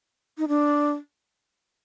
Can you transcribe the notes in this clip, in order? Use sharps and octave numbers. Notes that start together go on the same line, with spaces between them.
D#4
D4